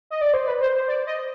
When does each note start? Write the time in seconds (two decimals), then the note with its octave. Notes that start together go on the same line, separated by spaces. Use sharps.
0.10 D#5
0.21 D5
0.34 C5
0.47 B4
0.61 C5
0.75 C5
0.88 D5
1.07 D#5